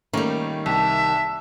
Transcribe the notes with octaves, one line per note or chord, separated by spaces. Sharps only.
D#3 G3 A3 A#3 C#4
C2 E5 A5